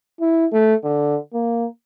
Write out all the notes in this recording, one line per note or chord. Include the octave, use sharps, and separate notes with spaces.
E4
A3
D3
A#3